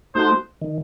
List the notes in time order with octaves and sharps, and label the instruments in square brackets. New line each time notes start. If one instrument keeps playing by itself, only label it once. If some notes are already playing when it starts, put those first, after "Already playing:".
[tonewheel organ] A3 D#4 F#4 [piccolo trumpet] C5
[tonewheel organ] D#3